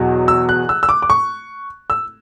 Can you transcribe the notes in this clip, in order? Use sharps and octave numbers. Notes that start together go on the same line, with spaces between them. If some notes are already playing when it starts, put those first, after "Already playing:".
Already playing: E2 B2 F#3
E6
F#6
E6
E6
D6
D6
C#6
E6